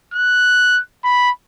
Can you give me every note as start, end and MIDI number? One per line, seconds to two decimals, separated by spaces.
0.14 0.80 90
1.04 1.30 83